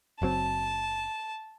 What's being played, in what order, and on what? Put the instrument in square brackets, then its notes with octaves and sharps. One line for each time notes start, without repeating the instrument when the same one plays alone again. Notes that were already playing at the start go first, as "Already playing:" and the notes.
[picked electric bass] F#1 F#3 C4 [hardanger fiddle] A5